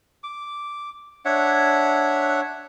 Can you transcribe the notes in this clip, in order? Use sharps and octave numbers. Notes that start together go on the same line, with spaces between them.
D6
D4 C#5 E5 F#5